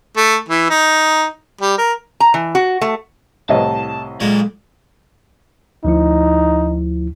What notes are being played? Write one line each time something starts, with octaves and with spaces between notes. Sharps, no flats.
A3
E3
D#4
G3
A#4
A#5
E3
F#4
A3
C2 A2 D#5 A5
A#2 F#3 G#3 A4
D2 F3 D#4 E4